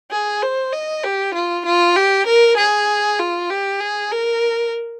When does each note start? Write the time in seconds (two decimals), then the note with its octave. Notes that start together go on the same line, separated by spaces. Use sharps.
0.11 G#4
0.42 C5
0.72 D#5
1.04 G4
1.34 F4
1.66 F4
1.96 G4
2.27 A#4
2.57 G#4
3.20 F4
3.50 G4
3.80 G#4
4.12 A#4